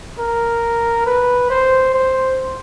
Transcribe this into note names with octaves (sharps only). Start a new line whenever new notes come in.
A#4
B4
C5
C5